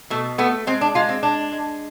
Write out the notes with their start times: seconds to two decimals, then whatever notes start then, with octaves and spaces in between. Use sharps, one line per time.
0.10 B2 A3
0.38 A3 B3
0.67 G#3 C4
0.81 D4
0.95 G#3 F4
1.09 C4
1.23 G#3 D4
1.52 G#3